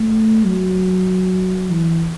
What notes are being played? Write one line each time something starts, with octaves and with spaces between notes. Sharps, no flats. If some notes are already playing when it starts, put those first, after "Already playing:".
Already playing: A3
F#3
E3